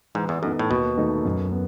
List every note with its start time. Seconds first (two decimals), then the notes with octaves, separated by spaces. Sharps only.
0.15 G#2 E3
0.29 E2
0.42 F#2 B3 D#4 A4
0.59 A2
0.70 D#2 B2
0.97 D#3 A3 D#4 A4
1.25 F#2
1.52 B3